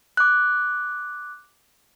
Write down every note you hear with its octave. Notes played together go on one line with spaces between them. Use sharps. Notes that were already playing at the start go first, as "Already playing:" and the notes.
D6 F#6